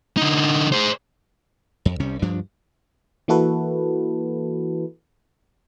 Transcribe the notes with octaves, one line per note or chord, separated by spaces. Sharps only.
D3 D#4
G#4 C5
F2
C2 C3 G3 C#4
D2 G2 F3 D4
E3 A#3 E4 F#4 A4 B4